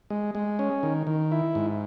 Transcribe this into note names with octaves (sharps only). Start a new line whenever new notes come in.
G#3
G#3
C#4
D#3
D#3
E4
G#2